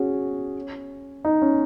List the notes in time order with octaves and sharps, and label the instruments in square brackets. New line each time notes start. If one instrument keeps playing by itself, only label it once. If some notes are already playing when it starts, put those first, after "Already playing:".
Already playing: [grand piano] C#4 F#4 G#4
D#4
C#4